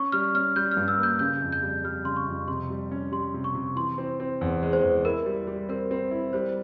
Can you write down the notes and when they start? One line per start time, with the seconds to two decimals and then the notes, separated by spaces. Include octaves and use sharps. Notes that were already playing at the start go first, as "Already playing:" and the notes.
Already playing: C#4 C#6
0.12 G3 F6
0.35 C#4 F6
0.56 G3 G6
0.71 F6
0.77 G2
0.88 E6
0.98 A#3 G6
1.19 C#3 G6
1.42 F2
1.52 G6
1.63 G3
1.84 G3 F6
2.05 C#3 C6
2.16 C#6
2.27 F2
2.48 C3 C6
2.70 G3
2.91 C#4
3.12 G3 C6
3.34 C3
3.44 C#6
3.55 C3
3.76 E3 C6
3.98 C4
4.20 C4
4.41 E2
4.62 G#3
4.73 C5
4.83 E2
5.05 E4 A#4
5.26 G3
5.47 G3
5.69 C4 A#4
5.91 C4
6.11 E4
6.33 G3 C5